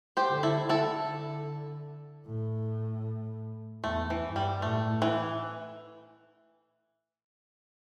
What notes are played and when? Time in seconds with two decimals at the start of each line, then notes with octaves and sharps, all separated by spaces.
0.17 G4 C5
0.30 D3
0.43 E4 A4
0.69 D3 E4 A4
2.26 A2
3.84 E2 A3
4.10 E3
4.23 G2
4.36 G3
4.62 A2 A3
5.02 E3